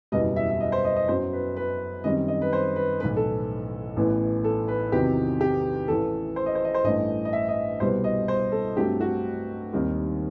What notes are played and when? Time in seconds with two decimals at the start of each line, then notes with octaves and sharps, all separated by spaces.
0.12 F#1 E2 B2 G3 D#5
0.36 E5
0.50 E5
0.60 D#5
0.72 C5
0.85 D#5
0.96 D#5
1.08 F#2 F#3 B3 C5
1.33 B4
1.56 B4
2.04 F#2 D#3 G3 C4 D#5
2.28 D#5
2.41 B4
2.53 C5
2.76 B4
3.00 B1 A2 E3 B4
3.17 A4
3.97 A1 A2 E3 B3
4.44 A4
4.68 B4
4.92 E2 C3 D#3 F#3 C4 G4
5.41 G4
5.88 A1 A2 E3 A4
6.36 C5
6.46 D#5
6.55 C5
6.65 D#5
6.74 C5
6.84 A1 G2 E3 A3 D#5
7.25 D#5
7.33 E5
7.49 D#5
7.80 C2 B2 G3 B3 C5
8.04 D#5
8.28 C5
8.52 A4
8.77 G2 F#3 A3 C4 G4
9.00 F#4
9.73 D#2 D#3 G3 C4